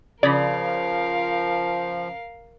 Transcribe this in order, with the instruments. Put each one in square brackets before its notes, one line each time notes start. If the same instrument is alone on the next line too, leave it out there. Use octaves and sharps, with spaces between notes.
[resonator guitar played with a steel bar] C#3 [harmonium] F3 [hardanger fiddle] A#4 F5 [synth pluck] D5 B5